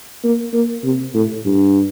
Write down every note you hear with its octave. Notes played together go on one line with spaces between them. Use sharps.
A#3
A#3
C3
A2
G2